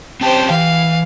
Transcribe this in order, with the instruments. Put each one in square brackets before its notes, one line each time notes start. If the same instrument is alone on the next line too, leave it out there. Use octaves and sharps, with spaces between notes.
[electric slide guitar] C4 C#4 A5 [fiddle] G4 C5
[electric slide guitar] E3 [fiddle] F5